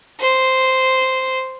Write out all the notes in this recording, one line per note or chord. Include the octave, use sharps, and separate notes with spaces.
C5